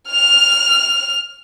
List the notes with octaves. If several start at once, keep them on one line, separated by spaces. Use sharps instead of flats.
F6 F7